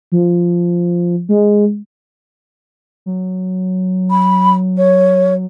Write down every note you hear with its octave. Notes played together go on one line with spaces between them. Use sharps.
F3
G#3
F#3
B5
C#5